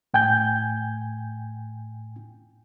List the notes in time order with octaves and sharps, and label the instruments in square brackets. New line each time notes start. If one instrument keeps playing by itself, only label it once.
[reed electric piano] A2 G5 G#5 G6